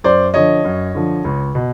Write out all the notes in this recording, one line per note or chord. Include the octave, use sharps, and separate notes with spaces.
F#2 C5 D5
D3 F3 C#5 D#5
F#2
D3 F3
C#2
B2